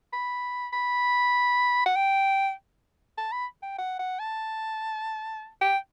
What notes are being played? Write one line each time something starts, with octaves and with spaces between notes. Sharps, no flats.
B5
B5
F#5
G5
A5
B5
G5
F#5
F#5
A5
G5